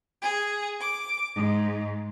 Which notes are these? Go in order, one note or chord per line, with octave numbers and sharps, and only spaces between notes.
G#4
D6
G#2